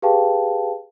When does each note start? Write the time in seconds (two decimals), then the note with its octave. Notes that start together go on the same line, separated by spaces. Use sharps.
0.02 G4 G#4 B4 F5 G5 A5